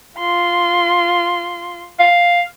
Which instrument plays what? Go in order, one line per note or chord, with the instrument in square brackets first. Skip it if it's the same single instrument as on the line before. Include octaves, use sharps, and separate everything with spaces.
[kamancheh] F4 C6
[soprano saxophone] F5